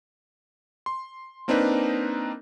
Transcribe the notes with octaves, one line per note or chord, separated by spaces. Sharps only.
C6
A#3 C4 D4 D#4 A#4 B4